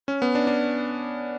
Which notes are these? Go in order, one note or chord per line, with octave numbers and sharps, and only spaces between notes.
C#4
B3
D4
D4